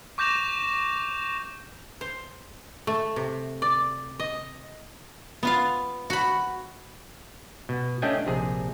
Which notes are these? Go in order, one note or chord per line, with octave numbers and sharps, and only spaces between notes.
C#6 D6 G6 A#6 E7 F7
C5
A3
C3
D5
D#5
B3 F4 F5
F#4 B5
B2
A3 C#4 D4 D#5 G5 G#5
A#1 C3 G#4